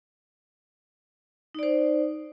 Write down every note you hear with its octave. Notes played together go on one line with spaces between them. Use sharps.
D#4 C5 D5